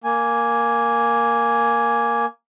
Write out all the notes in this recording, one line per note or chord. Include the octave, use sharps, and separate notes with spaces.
A#3 G#5